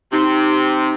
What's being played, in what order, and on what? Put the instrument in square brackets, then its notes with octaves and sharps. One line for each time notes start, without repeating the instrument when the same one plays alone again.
[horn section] C3 [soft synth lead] D#4